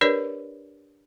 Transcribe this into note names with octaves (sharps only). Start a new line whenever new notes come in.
D4 G4 A#4 B4 C#5 D5